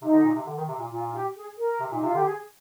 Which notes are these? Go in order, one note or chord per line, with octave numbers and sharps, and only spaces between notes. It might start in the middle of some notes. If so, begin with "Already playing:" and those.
C3 D#4
D3
A#2
C3
D3
D#3
C3
A#2
A#2 F4
F4
G4
G#4
A#4
C3
A#2 D#4
C3 F4
D3 G4
G#4